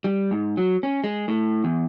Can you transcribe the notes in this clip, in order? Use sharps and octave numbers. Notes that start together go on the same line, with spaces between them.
G3
G#2
F#3
C#4
G#3
A2
E2